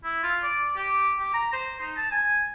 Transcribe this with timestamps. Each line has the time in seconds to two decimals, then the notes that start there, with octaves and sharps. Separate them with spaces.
0.04 E4
0.23 F4
0.42 D5
0.76 G4
1.19 G4
1.34 A#5
1.53 C5
1.81 D#4
1.97 A5
2.11 G#5